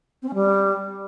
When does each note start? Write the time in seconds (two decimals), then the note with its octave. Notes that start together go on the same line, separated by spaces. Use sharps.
0.22 C4
0.28 C#4
0.34 G3